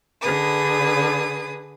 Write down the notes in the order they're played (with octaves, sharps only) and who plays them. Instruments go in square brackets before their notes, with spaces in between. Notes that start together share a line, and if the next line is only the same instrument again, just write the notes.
[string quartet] D3 G#4 B4 D#6